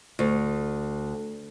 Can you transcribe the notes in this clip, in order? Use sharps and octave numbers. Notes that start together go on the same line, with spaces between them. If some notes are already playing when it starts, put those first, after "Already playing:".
D2